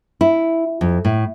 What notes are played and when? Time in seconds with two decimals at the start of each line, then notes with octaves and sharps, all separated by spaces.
0.21 E4
0.81 F2
1.05 A2